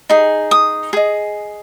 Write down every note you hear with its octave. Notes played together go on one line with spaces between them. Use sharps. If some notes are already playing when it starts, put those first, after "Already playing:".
D#4 G#4
D#6
G#4 D#5